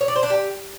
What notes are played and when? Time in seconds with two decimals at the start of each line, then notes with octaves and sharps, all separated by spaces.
0.01 C#5
0.08 D5
0.15 C5
0.23 D4
0.30 G4